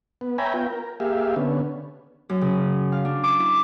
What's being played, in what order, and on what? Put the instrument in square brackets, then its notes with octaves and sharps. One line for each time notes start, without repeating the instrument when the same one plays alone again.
[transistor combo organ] B3
C#5 E5 G5 G#5 A#5 B5
B3 F4 G5
A#4
A#3 G4 G#4 E5 F5
D3 B3 C#4
[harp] F#2
C#3
F5
D4
D6
E4